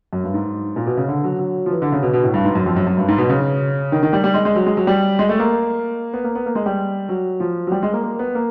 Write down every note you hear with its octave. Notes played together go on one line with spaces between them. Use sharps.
F#2
G2
G#2
A#2
B2
C#3
D3
F#3
F#3
F3
E3
D3
C#3
B2
B2
A2
G2
G#2
F#2
F2
F#2
F#2
G2
G#2
B2
C#3
D#3
D#3
G3
G3
G#3
G#3
F#3
G#3
F#3
G3
G#3
A3
A#3
B3
A#3
B3
A#3
G#3
G3
F#3
F3
F#3
G3
G#3
A#3
A#3
B3
A#3